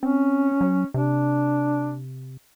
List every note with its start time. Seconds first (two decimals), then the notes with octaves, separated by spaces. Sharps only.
0.03 C4 C#4
0.61 F#3
0.94 C3 D4